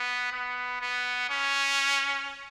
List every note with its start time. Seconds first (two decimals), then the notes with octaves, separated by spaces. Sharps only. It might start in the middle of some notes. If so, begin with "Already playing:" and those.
Already playing: B3
0.32 B3
0.81 B3
1.30 C#4